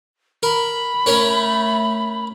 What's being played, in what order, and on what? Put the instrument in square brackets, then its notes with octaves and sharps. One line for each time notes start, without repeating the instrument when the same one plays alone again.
[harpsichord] A#4 [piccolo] B5
[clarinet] A3 [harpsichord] C#4 A#4 C#5